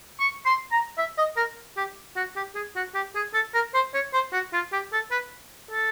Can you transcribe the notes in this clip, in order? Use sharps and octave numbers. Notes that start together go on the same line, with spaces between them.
C#6
C6
A#5
E5
D#5
A#4
G4
F#4
G4
G#4
F#4
G4
G#4
A4
A#4
C5
C#5
C5
F#4
F4
G4
A4
B4
A4